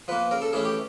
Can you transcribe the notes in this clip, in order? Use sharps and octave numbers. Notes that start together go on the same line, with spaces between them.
F3 A#3 B4
C#3 A#4
A4
E3 A3 C#4 G#4
G4